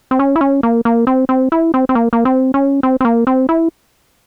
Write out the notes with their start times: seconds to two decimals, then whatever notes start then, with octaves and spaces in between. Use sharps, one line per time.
0.11 C4
0.19 C#4
0.36 E4
0.41 C#4
0.63 A#3
0.85 A#3
1.07 C4
1.29 C4
1.52 E4
1.74 C4
1.89 C4
1.95 A#3
2.13 A#3
2.25 C4
2.54 C#4
2.83 C4
3.01 C4
3.05 A#3
3.27 C4
3.49 E4